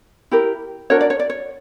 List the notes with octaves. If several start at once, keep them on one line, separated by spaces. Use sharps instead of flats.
E4 G4 A#4
D4 F#4 A#4 C#5
D5
C#5
D5
C#5